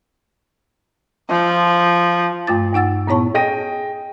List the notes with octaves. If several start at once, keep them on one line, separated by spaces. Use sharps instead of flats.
F3
G2 A3 F4 D6 A6
G2 D#4 F#5 E6 A6
A#2 B3 E4 C#5 A5 C#6
G#4 D#5 G5 A#6 D#7